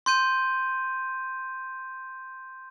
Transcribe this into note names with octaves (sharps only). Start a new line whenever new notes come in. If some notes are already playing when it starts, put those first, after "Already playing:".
C6 G6 D#7